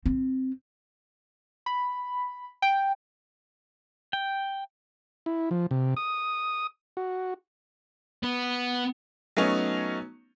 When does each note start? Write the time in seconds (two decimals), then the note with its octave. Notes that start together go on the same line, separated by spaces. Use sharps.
0.06 C4
1.66 B5
2.62 G5
4.13 G5
5.26 E4
5.51 F3
5.71 C3
5.97 D#6
6.97 F#4
8.23 B3
9.37 F#3 A3 B3 C#4 D#4